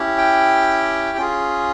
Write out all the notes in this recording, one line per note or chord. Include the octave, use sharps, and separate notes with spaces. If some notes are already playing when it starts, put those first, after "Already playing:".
Already playing: C#4 E4 G4
G5
C#4 F4 G#4